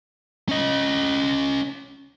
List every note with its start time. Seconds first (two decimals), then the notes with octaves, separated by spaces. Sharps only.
0.49 C#4 D#5